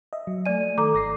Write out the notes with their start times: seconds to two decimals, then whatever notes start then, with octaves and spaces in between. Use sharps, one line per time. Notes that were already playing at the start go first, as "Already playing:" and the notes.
0.13 D#5 E5
0.27 F#3
0.46 A3 D5 G#5 D#7
0.78 D#3 A4 A#5 D6
0.94 G1 D6 A#6 C7